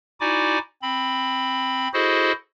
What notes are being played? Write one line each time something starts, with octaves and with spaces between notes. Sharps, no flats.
D#4 E4 F#4 D5 G#5 D6
C4 B5
E4 F#4 G#4 A4 C5 D#5